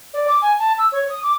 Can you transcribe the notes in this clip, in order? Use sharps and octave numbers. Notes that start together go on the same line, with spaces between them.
D5
D6
G#5
A5
E6
C#5
D#6
D6